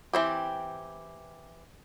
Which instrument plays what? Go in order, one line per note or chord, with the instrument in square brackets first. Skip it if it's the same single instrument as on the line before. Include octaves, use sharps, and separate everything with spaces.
[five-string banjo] E3 C4 G4